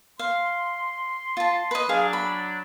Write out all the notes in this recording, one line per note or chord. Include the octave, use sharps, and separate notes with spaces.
F5 C6
F4 A5
B4 D#5
F#3 D4 G#4 F5 G#5
B5